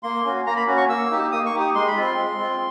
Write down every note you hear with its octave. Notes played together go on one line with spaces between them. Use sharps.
A#3 C6
C#4 F#4
A#3 A#5
B5
C#4 F#4
C#6
A#3 E6
D#4 G4
A#3 D#6
C#6
D#4 G4
D#6
G#3 C6
B5
C4 F4 C6
G#3
C4 F4